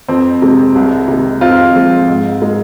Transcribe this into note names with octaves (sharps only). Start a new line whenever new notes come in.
F2 C4
C3 G#3
C2
C3 D#3 G#3
F2 C4 F4
F3 G#3
G#2
G#3